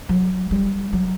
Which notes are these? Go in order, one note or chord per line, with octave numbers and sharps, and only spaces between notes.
F#3
G3
F#3